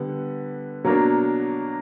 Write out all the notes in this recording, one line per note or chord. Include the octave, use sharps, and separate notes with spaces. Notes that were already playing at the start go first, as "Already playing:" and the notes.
Already playing: D3 G3 B3
B2 F#3 A#3 D4 A#4